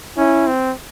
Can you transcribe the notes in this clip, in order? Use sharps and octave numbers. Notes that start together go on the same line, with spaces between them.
C#4 E4
C4